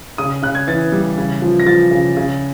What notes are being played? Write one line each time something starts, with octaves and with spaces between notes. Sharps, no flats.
C#3 D#6
C#3 F#6
G#6
E3 A6
G3
C#3
F3
A#6
F3 A6
C#3
C#3